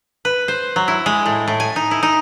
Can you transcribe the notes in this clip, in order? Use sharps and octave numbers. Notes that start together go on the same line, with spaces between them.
B4
C5
F#3
E4
G#3
A2
A2
G#5
D#4
E4
D#4